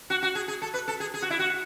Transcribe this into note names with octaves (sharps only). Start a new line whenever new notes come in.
F#4
F#4
G#4
G#4
A4
B4
A4
G#4
G#4
F#4
E4
F#4